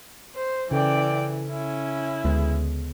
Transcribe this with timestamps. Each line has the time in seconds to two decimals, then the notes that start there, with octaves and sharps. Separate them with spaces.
0.35 C5
0.71 C#3 E3 A4 D5 G5
1.51 C#4 E4
2.24 D2 G#3 B3